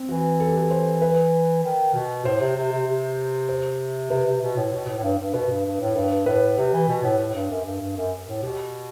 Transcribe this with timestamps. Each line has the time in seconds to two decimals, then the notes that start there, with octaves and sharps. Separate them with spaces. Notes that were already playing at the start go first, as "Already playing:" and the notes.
Already playing: C4
0.09 E3 F#4
0.40 A4
0.49 G4
0.57 A4
0.71 C5
1.02 B4
1.63 D#3
1.94 B2
2.25 A2 C5
2.40 C3
2.56 C3
2.72 C3
2.87 C3
3.49 C5
4.10 C3 B4
4.26 C3
4.41 B2
4.56 A2
4.72 B2
4.87 A2
4.98 A2
5.03 G2
5.19 G2
5.34 B2 B4
5.49 G2
5.65 G2
5.80 A2
5.95 G2 B4
6.26 A2 B4
6.58 C3 G4
6.73 E3
6.88 B2
7.03 A2
7.19 A2
7.35 G2
7.50 F#2
7.65 G2
7.81 G2
7.96 F#2
8.27 A2
8.42 B2 G4